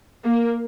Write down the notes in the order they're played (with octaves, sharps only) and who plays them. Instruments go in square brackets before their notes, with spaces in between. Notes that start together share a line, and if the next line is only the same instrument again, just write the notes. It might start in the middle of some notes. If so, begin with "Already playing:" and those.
[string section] A#3